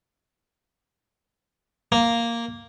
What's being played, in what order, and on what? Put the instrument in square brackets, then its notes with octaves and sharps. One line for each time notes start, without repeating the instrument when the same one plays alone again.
[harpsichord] A#3